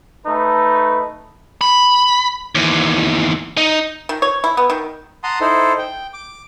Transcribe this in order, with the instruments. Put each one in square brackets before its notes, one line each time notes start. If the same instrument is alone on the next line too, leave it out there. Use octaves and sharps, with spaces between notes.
[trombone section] A3 D#4 B4
[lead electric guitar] B5
D#2 E3
D#4
[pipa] D#3
C#5
E4
B3
D#3
[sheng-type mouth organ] F#5 A5 A#5 C6 D#6
D#4 E4 A4 C5
G5
D6